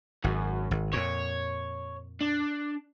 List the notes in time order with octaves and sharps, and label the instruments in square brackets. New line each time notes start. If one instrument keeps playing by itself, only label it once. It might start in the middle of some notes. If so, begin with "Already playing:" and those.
[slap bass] G#1 [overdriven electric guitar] F#2
[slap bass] G#1
[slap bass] F2 A#2 [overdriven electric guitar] C#5
[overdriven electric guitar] D4